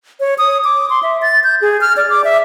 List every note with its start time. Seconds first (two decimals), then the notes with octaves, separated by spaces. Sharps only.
0.20 C#5
0.38 D#6
0.64 D6
0.90 C6
1.03 E5
1.22 A6
1.44 G6
1.61 G#4
1.81 F6
1.97 D5
2.10 D6
2.24 E5